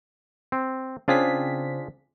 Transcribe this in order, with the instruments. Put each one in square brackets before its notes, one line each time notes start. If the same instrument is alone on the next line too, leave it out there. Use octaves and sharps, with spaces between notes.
[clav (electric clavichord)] C4
[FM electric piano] C#3 C4 B6 [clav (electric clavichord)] D4 F4 G#4